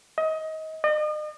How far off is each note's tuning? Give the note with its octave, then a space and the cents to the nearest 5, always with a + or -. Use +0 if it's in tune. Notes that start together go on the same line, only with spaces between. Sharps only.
D#5 +25
D#5 -40